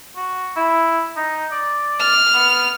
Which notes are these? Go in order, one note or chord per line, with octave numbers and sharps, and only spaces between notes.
F#4
E4
D#4
D5
F6
B3